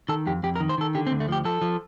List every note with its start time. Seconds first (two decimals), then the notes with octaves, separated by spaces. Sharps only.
0.09 D#3 A4
0.26 F2 G4
0.43 F2 G4
0.56 A#4
0.60 D#3
0.69 C5
0.78 D#3 A4
0.95 D3 G4
1.07 C4
1.12 D2
1.20 A3
1.28 F3 G4
1.45 F3 A4
1.62 F3